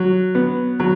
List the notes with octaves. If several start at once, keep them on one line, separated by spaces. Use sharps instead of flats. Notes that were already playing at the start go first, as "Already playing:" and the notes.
Already playing: F#3
B3
F#3